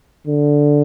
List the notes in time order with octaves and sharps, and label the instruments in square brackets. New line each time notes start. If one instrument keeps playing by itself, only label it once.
[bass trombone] D3